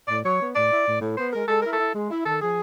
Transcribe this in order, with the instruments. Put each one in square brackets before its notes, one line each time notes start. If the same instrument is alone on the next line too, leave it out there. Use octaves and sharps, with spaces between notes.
[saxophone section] A2 D5
F#3 C#5
B3
A2 D5
E4
A2
A2
B3 C5
G#3 A#4
G#3 A4
E4 A#4
A4
E4
G#3
E4
D#3 A4
F3 G#4